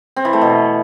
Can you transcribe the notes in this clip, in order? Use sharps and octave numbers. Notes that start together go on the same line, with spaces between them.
C4
E3
A3
B2